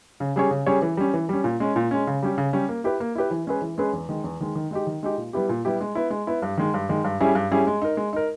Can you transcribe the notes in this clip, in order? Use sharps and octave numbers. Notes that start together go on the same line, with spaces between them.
C#3
G3 C#4 G#4 C#5
C#3
G3 C#4 G#4 C#5
E3
G3 C#4
E3
G3 C#4
A#2
G#3 C#4
A#2
G#3 C#4
C#3
G3 C#4 G4
C#3
G3 C#4 G4
A#3
E4 G4 B4
A#3
E4 G4 B4
E3
G#3 C#4 G#4 B4
E3
G#3 C#4 G#4 B4
E2
D#3 G#3
E2
D#3 G#3
D#3
G#3 D#4 G4
D#3
G#3 D#4 G4
A#2
G3 B3 E4 G4
A#2
G3 B3 E4 G4
G#3
B3 E4
G#3
B3 E4
G2
D#3 G#3
G2
D#3 G#3
G2
G3 C#4 E4 G#4
G2
G3 C#4 E4 G#4
G#3
D#4 A#4
G#3
D#4 A#4